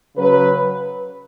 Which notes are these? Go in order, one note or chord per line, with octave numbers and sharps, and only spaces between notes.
C#3 F#3 B4